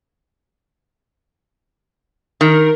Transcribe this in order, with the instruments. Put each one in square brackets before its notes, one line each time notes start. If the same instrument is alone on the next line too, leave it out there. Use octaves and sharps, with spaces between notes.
[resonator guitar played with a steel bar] D#3 [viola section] A#4